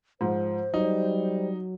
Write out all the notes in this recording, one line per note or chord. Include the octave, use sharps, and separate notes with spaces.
G#2 F3 C5
F#3 G3 D#4